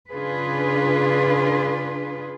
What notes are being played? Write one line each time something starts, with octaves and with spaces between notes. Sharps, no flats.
C#3 D4 F4 G#4 B4